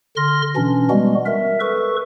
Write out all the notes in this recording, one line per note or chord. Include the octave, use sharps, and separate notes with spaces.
D3 C6 F6 A#6
B2 E3 C#4 D4
G3 G#3 B3 F#4
A#4 E5
A4 B4 C#6